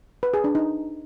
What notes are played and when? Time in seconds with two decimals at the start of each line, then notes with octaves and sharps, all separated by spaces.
0.23 B4
0.34 G#4
0.44 D4
0.55 D#4